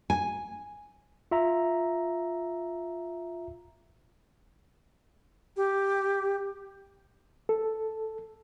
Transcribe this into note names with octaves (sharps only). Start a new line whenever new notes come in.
G#5
F4 E5 A#5
G4
A4